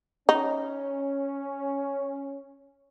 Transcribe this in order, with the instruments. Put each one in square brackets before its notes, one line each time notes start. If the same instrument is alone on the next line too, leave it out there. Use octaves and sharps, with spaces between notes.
[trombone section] C#4 [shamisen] D#4